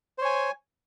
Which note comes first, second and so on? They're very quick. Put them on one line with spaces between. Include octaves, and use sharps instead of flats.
C5 C#5 G#5